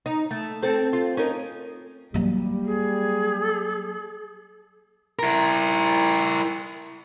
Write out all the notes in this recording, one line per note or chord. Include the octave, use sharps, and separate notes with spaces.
D#4
A3
C4 A4
F4
C#4 D#4 A#4
F#3 G3 A#3
G#4
E4 A#4